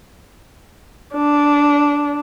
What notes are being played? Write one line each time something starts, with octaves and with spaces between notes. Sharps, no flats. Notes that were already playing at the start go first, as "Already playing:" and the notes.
D4